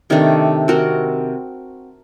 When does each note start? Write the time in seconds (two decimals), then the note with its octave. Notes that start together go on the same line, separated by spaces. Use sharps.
0.10 C3 D#3 A3 D4
0.68 C4 F#4 A#4